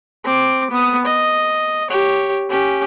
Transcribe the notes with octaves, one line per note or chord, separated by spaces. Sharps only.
C4 D6
B3 D#6
D#5
G4 C#5
C#4 G4